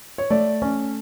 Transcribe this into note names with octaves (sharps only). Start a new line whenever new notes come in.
C#5
A3 D5
C#4